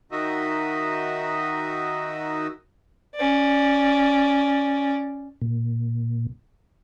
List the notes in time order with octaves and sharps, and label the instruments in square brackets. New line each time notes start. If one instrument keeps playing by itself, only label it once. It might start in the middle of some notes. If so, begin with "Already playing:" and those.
[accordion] D#3 D#4 F#4 D#5 E5
[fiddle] C#4 D5
[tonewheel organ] A#2